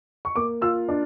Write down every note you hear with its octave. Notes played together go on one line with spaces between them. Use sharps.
C#6
A#3 D6
F4 E6
D4